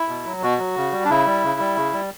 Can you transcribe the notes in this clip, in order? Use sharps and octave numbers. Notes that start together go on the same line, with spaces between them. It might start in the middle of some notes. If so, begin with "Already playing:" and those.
Already playing: E4
B2
F#3
B2 F#4
F#3
C#3
G3
D4
C#3 E4
G3
C#3
G3
C#3
G3